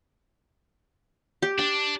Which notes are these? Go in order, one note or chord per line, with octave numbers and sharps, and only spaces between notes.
G4
D4 G5